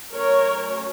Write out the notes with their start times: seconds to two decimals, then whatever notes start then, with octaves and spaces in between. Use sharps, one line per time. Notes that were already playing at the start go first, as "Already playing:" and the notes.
0.12 F#3 A3 C#4 A#4 C#5